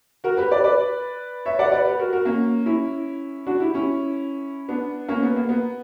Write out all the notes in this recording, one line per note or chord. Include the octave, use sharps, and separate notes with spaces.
F#4 A#4
G4 B4
B4 D5
B4 D5
C#5 E5
D5 F#5
B4 D5
G4 B4
F#4 A#4
F#4 A#4
A#3 C#4
C#4 E4
D4 F#4
E4 G4
C#4 E4
B3 D4
A#3 C#4
B3
A#3
B3